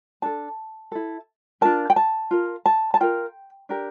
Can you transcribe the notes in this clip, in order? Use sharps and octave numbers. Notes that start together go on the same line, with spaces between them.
D4 A4 A5
E4 A4
D4 F4 A#4 A5
G5
A5
F4 A#4
A5
A5
F4 A#4 G5
D4 G4 A#4